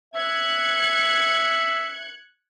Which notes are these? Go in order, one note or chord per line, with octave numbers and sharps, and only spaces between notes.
E5 F#6 G#6 C#7